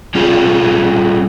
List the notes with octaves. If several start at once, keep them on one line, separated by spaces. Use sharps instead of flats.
G3 C#4 F4 G#4